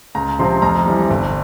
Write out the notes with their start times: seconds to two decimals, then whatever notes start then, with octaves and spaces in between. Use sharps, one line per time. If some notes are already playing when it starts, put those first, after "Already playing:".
0.15 C#2 A#5
0.39 C3 F3 C4 C6
0.62 F2 A#5
0.86 E3 G3
1.10 G1